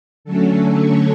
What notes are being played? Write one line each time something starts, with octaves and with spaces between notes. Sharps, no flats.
D3 F#3 A3 C#4 A4
C#5